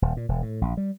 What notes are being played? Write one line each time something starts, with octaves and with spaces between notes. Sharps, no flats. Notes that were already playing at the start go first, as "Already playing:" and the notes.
D#1
A#2
E1
A2
A#1
G3